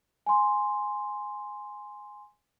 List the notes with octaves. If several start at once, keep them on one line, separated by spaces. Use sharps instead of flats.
G#5 C6